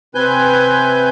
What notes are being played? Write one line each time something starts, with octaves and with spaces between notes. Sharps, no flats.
C3 C4 B4 G#5 G6